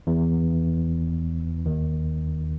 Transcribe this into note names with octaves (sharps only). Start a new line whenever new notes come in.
E2 E3
D#2 D#3